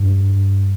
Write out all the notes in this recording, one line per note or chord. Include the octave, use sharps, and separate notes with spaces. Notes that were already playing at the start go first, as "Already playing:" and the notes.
Already playing: G2